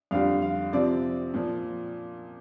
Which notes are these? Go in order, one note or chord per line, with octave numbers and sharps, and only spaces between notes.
F2 D3 G3 F5
F5
C3 F3 C4 D5
A#2 F3